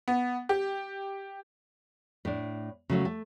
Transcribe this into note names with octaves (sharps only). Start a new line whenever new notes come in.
B3
G4
A2 D4
C#3 F#3 A3
A3